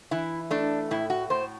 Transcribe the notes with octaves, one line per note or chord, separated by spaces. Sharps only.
E3 E4
A3 D4
A2 E4
F#4
A2 C5